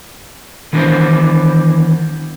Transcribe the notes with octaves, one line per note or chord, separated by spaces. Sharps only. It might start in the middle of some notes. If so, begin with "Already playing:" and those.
D#3 E3 B3 D4 A#4 C5